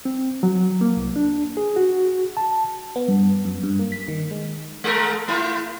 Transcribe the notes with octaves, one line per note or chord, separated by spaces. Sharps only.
C4
F#3
A#3
C2
D4
G#4
F#4
A5
B3
G2
F#2
G2
A#3
B6
D#3
G#3
G#3 A4 A#4
A3 E4 F4